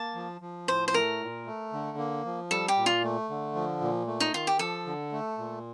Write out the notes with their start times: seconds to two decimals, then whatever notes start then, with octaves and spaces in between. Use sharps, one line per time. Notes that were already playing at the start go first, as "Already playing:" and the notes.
Already playing: A#3 A5
0.15 F3
0.41 F3
0.68 A2 C5
0.88 C5
0.93 A3 A#4
1.21 A#2
1.46 A3
1.73 D3
1.98 A#3
2.25 F3
2.51 G3 A4
2.68 G4
2.77 A#2
2.86 F4
3.04 A3
3.30 D3
3.55 F3
3.81 A#2
4.07 A3
4.20 D#4
4.34 D#3 F4
4.47 G4
4.59 F3 A4
4.86 D3
5.12 A3
5.38 A#2